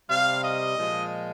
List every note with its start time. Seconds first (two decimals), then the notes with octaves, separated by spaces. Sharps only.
0.09 C3 G3 F5
0.43 D#5
0.77 A#2 F3 G#3